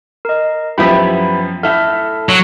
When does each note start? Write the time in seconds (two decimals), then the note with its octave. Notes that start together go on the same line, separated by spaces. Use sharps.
0.25 A#4 D#5
0.78 F#2 F3 B3 E4 G4 B5
1.63 A2 A4 E5 F6
2.29 F#3